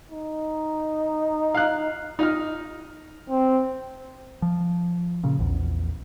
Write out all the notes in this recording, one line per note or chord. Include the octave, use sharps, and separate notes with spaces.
D#4
F5 F#6
D#4 D#5 F6
C4
F3
A#2 C#3
A#1 E2